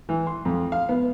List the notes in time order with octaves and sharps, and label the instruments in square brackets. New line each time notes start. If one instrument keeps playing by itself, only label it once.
[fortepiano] E3
C6
F2
F5
B3